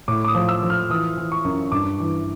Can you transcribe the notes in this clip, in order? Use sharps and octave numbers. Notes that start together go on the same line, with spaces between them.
A2 D6
D6
D#6
F3
E6
F3
F6
E3 D#6
E3
C#6
F#2
G2 D6
E3